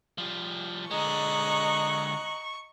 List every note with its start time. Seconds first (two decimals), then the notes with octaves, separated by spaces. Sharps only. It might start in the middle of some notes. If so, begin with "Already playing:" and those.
0.18 F3 G3
0.91 D3 G#3 D#5 A#5 C#6 F#6